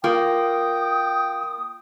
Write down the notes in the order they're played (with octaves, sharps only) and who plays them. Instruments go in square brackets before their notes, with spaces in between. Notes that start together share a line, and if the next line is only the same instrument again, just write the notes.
[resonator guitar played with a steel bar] A#3 [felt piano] F4 [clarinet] G5 [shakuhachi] D#6